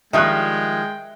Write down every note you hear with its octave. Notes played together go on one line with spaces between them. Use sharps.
D#3 F3 G3 G#3 E5 G5 F#6